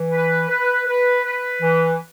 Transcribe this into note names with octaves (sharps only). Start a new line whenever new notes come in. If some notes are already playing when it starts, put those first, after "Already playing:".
Already playing: E3
B4
B4
B4
B4
E3